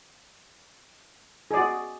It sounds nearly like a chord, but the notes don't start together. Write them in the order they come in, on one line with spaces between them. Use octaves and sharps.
G#4 D5 F#4